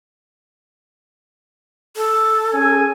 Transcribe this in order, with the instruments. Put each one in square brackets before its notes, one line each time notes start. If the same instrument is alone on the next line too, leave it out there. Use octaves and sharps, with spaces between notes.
[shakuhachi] A4
[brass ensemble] C#4 G#4 G#5